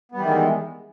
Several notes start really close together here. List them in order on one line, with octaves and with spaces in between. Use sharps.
B3 G3 E3 D#3 G#3